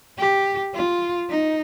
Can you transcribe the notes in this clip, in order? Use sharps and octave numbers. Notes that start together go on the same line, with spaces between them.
G4
F4
D#4